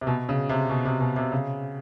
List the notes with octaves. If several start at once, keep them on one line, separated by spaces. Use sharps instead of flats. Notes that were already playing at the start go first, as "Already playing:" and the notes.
C3
B2
C#3
C3
B2
C3
B2
C3
C#3